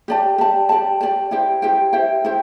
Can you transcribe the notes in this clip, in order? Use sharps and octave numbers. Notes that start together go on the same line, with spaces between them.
G4 D5 A5
G4 D5 A5
G4 D5 A5
G4 D5 A5
E4 G4 C5 G5
E4 G4 C5 G5
E4 G4 C5 G5
E4 G4 C5 G5